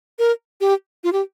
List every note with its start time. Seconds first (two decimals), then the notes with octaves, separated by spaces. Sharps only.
0.19 A#4
0.61 G4
1.04 F4
1.13 G4